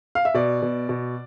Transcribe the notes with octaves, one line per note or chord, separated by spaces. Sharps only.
F5
E5
B2 D5
B2
B2